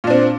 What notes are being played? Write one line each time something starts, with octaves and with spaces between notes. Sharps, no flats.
A#2 C4 D4